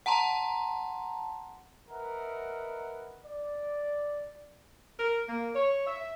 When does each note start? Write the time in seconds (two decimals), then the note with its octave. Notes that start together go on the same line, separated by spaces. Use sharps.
0.06 F#5 A5 A#5 C6
1.89 A#4 B4 D#5 E5 F#5 A#5
3.25 D5
4.99 A#4
5.28 A#3
5.55 C#5
5.87 E5